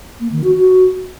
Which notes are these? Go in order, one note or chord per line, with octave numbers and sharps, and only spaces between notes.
A#3
D#3
F#4
F#4